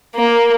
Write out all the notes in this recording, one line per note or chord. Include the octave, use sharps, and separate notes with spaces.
A#3